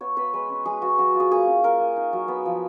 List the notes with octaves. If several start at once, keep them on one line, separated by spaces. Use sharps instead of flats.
B3 C#5
B3 B4
G#3 B4
C#4
G#3 G#4
B3 F#4
F#3 F#4
F4
G#4
A#3 G#4
C#4
A#3 A#4
A#3
D#4
F#3
B3
F3